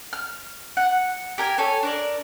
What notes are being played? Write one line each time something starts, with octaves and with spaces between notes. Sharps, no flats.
F6
F#5
G4 A#4 G#5
A4 C#5 G#5
D4 A#4 D5